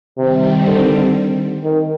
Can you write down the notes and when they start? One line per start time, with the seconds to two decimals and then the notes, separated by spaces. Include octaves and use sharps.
0.18 C3 D#3 G3 C4
0.66 D3
1.63 D#3